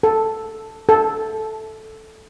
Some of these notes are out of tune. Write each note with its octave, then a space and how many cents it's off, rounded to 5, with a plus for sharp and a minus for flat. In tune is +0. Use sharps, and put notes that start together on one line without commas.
A4 +0
A4 -5